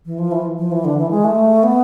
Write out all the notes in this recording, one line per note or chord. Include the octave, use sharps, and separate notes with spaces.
E3
F3
E3
F3
E3
D3
E3
G#3
A3
B3